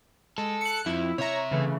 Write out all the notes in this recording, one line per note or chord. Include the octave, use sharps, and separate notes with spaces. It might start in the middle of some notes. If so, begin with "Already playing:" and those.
G#3 A4
F#6 C#7
F2 F3 E4
C3 C#5 E5 A#5
C#3 E3 A3